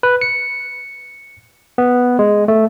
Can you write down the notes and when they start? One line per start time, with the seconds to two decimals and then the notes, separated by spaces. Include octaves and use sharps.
0.03 B4
0.21 C#7
1.78 B3
2.19 G#3
2.48 A3